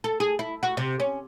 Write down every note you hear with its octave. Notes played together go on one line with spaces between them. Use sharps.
A4
G#4
E4
F#4
C3
C#4